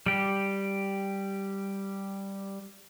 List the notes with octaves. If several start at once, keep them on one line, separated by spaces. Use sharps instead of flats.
G3 G4